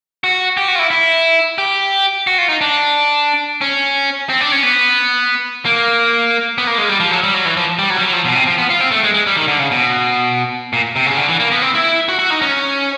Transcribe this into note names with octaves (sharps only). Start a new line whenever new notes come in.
F#4
G4
F#4
F4
E4
E4
G4
F#4
F4
D#4
D4
C#4
C4
D4
C#4
B3
A#3
B3
A#3
G#3
G3
F3
F#3
G3
F#3
E3
F3
G3
F#3
G3
F#3
F3
B2
C3
F3
B3
F4
C4
A3
G#3
G#3
G3
D#3
D3
C#3
B2
A#2
C3
C#3
D3
E3
A#3
B3
C4
E4
F#4
F#4
D#4
C#4